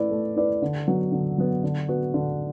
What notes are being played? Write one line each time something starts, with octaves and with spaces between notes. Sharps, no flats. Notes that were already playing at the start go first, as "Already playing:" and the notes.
Already playing: A3 E4 B4 D5
A3
E4 B4 D5
D3
F#3 B3
D3
F#3 B3
D3
B3 F#4
D3